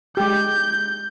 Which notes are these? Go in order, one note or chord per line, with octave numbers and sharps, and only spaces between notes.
G#3 G4 G6